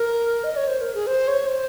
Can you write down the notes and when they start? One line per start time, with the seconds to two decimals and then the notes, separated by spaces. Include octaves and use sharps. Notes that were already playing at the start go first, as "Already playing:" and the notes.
Already playing: A#4
0.44 D#5
0.56 C#5
0.68 C5
0.81 A#4
0.95 G#4
1.07 C5
1.28 C#5
1.47 C5